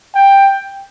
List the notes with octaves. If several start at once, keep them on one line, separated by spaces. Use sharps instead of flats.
G5